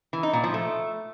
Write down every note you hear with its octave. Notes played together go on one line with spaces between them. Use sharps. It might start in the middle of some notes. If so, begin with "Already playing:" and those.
E3
D#4
A#2
F3
A3